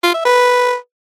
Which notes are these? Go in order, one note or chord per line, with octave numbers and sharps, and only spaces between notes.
F4
E5
B4